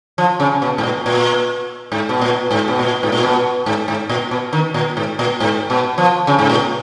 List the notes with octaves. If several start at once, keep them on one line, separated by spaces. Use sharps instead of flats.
F3
C#3
B2
G#2
A#2
A#2
G#2
B2
A#2
G#2
B2
A#2
G#2
A#2
B2
G#2
G#2
A#2
B2
D#3
A#2
G#2
A#2
G#2
B2
F3
C#3
G#2
A#2